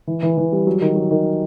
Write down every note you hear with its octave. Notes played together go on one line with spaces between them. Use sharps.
E3
E3
E3
G3
F#3
D#3
F#3
D#3